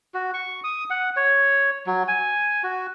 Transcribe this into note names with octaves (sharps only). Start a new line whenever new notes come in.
F#4
C#6
D#6
F#5
C#5
F#3
G#5
F#4